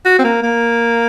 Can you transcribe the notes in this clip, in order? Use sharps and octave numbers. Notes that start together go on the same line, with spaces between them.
F#4
C4
A#3
A#3